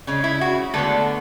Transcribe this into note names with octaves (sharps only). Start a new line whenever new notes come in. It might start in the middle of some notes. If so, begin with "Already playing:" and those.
C#3 G#3 C#4
E4
F#4
D3 G#3 A3 B3 D4 A4